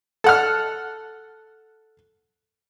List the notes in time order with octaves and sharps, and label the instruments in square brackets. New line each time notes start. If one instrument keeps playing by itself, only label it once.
[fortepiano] A4 F#5 F6